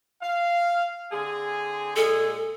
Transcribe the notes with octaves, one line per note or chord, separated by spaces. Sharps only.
F5
D3 C4 G#4
A#2 G#3 G#4 A4